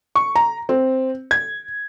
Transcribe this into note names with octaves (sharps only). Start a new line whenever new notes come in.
C#6
A#5
C4
G#6